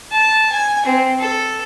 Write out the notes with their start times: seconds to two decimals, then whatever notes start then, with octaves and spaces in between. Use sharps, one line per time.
0.12 A5
0.52 G#5
0.85 C4
1.19 A4